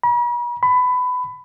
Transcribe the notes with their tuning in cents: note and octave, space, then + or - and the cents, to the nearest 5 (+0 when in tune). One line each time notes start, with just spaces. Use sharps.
B5 -45
B5 +20